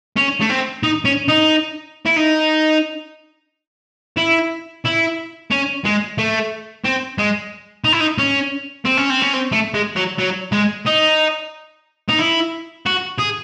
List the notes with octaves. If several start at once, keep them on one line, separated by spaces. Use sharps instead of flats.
C#4
A3
C4
D#4
C#4
D#4
E4
D#4
E4
E4
C#4
G#3
A3
C4
G#3
D#4
E4
D#4
C#4
C4
C#4
C4
C#4
C4
A3
G#3
F#3
F#3
G#3
D#4
D#4
E4
F#4
G#4